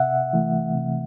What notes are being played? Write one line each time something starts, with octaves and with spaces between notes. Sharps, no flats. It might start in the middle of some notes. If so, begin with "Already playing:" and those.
Already playing: C3 E5 F#5
E3 A3
C3